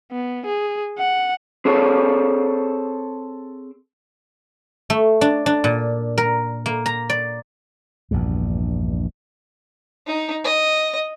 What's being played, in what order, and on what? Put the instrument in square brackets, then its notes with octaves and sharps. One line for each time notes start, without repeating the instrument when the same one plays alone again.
[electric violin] B3
G#4
F#5
[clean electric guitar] C4 G#4 A4 C#5
[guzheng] A3
D4
D4
A#2
A#4
A#3
A#5
D5
[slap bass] A#1 E2 G2
[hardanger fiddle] D#4
D#5